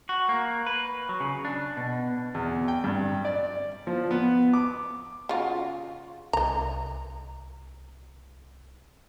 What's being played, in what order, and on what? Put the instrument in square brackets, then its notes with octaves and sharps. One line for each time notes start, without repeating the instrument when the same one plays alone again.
[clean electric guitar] F#4
A#3
B4
F#3
C#3
D4
B2
[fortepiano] E2
G5
G2
D5
F3
B3
D6
[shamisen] C#3 F4 F#4
[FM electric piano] C2 [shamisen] D#5 A#5